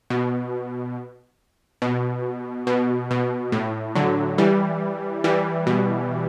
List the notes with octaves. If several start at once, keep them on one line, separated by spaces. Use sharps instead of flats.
B2
B2
B2
B2
A2
D3 F#3
E3 G3
E3 G3
B2